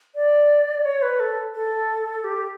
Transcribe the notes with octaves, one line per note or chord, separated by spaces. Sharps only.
D5
C#5
B4
A4
A4
G4